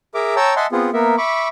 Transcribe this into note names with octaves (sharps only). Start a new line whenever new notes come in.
G#4 A#4 E5 A#5 D6
C#5 G5 A5 A#5 E6
D#5 E5 F#5 G#5 A5 C6
B3 C4 F4 G#4
A#3 B3 A#4 E5
E5 B5 C#6 D6